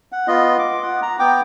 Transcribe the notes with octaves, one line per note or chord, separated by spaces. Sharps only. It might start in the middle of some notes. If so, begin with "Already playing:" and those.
F#5
B3 F4 D#5
D6
F#5
A#5
B3 G5 D6